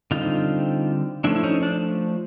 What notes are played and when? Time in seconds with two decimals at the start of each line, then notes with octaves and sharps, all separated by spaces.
0.11 D3 G3 C4 D#4 F4
1.24 F3 A3 C#4 D4 E4
1.36 E4
1.44 C#4 D#4
1.63 D4